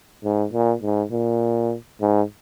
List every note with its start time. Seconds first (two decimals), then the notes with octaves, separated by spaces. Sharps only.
0.24 G#2
0.53 A#2
0.82 G#2
1.12 A#2
2.01 G#2